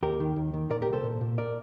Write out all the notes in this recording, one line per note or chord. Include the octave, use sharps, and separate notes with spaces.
D#2 G4 A#4
D#3
D#2
D#3
A#2 A#4 D5
G4 A#4
C2
A4 C5
A#2
A#2
A#4 D5